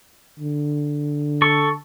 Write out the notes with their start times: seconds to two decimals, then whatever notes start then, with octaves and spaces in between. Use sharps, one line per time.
0.40 D3
1.42 A4 C#6